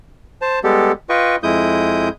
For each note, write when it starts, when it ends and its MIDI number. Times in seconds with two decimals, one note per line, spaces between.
0.42 0.59 72
0.42 0.59 81
0.64 0.92 55
0.64 0.92 56
0.64 0.92 59
0.64 0.92 67
0.64 0.92 69
1.09 1.36 65
1.09 1.36 71
1.09 1.36 75
1.09 1.36 79
1.09 1.36 85
1.43 2.09 41
1.43 2.09 56
1.43 2.09 64
1.43 2.09 87
1.43 2.09 91